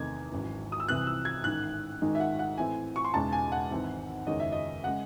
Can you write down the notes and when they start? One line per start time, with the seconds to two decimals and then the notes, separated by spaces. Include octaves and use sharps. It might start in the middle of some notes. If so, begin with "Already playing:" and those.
Already playing: E2 C3 D#3 A3 D#4 G#6
0.32 G#1 F#2 E3
0.72 D#6
0.80 E6
0.88 C2 C3 E3 C4 F#6
1.07 E6
1.25 G#6
1.44 A1 G#2 D#3 F#6
2.02 G#1 G#2 D#3 G#3 D#4
2.15 E5
2.20 F#5
2.39 F#5
2.58 A2 E3 C4 E4 G#5
2.96 C#6
3.05 C6
3.14 E1 E2 C#3 G#3 D#4 A5
3.33 G#5
3.52 F#5
3.71 G#1 G#2 E3 C4 E4
4.27 F#1 E2 D#3 G#3 C#4 D#5
4.40 E5
4.52 D#5
4.84 C#3 G#3 F#5